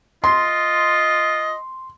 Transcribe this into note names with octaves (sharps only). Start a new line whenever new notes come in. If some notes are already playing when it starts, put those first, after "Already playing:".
F4 D#5 C6